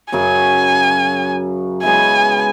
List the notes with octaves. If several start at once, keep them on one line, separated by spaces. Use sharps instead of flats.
F#2 C#3 F#3 G#5
C#3 G#3 B3 E4 G#5